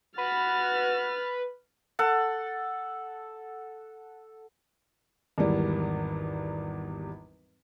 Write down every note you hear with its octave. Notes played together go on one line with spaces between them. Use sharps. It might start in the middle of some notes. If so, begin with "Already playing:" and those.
F#4 B4 F6 A6
A4 F#5
G#1 E2 G3